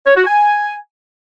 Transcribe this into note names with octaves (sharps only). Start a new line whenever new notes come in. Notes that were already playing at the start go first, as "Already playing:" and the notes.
C#5
F#4
G#5